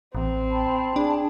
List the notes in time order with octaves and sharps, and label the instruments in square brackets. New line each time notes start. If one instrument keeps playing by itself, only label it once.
[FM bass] A1 [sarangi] C4
[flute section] G5 A5 B5
[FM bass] D4 [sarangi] G#4